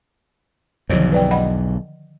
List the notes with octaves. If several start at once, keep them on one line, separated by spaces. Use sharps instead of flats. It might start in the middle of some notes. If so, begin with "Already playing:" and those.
B1 E2 D3 D#3 F3
B4 D5 G5
D#5 F#5 B5